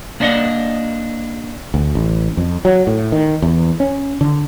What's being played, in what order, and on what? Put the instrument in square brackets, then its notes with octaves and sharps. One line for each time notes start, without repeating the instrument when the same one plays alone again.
[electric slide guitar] A#3 D4 D5 D#5 F#5
[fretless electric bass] D2
A1
F2
F#3
A2
D#3
E2
C#4
D3